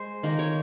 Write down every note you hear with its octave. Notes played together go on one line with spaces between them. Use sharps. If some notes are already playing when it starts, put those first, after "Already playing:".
Already playing: G#3 C5
D#3 A#3
C#5